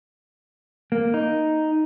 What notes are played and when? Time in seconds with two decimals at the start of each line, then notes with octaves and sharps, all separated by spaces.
0.92 A#3
1.14 D#4